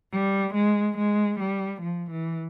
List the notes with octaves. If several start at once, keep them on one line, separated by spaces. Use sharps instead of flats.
G3
G#3
G#3
G3
F3
E3